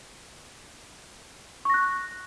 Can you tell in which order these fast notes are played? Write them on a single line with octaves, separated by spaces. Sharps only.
C#6 A#6 F#6